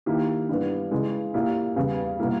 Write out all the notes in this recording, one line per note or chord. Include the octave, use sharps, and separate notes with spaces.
D#3 A#3 E4 G4
G2 E3 G3 B3
C#3 E3 G#3
A#2 A#3 E4 G4
E2 C#3 G3 B3
B2 G3 A#3 E4